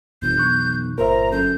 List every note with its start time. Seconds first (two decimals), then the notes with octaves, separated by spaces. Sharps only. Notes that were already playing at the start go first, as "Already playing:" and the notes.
0.22 G1 F2 B2 E3 G6
0.38 B1 C#6 F#6
0.98 G1 A#2 A#4 C5 E5 A#5
1.32 F#2 A4 G6